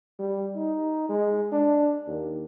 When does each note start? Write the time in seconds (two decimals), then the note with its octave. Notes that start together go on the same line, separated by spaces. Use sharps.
0.20 G3
0.56 D#4
1.09 G#3
1.52 D4
2.07 D#2